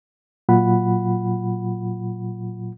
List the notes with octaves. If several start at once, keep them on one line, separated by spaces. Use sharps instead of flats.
A#2 F#3 F4 F#5 B5